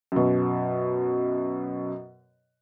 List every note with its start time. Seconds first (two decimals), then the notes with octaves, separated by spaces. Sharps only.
0.12 F#2 B2